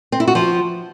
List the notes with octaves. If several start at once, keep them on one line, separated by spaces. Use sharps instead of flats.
C4
E4
F#4
F3